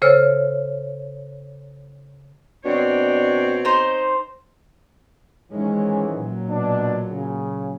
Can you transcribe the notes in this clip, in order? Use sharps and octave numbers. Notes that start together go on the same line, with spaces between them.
C#3 A4 C5 C#5 E6 F6
B2 C4 D4 C#5
D#4 C5
G#2 D#3 E3 G#3 C#4
A#2 F#3
B2 D4
C#3